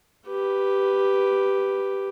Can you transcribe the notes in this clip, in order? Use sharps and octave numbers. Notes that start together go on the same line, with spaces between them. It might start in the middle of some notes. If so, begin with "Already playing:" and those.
G4 B4